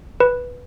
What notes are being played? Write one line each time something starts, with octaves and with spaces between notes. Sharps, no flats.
B4